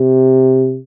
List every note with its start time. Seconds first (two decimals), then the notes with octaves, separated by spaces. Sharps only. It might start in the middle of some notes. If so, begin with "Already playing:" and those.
Already playing: C3